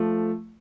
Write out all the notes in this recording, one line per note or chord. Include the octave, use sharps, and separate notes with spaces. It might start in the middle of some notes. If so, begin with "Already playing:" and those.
Already playing: F3 A3